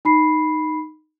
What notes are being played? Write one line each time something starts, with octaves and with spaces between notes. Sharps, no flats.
D#4 B5 C7